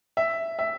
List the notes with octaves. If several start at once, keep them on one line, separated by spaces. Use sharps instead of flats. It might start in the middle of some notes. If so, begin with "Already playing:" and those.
E5
E5